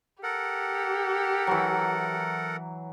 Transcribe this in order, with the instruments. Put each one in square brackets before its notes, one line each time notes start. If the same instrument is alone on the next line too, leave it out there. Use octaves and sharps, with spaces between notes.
[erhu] G4 [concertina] A4 A#4 F#5
[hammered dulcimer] E3 F#3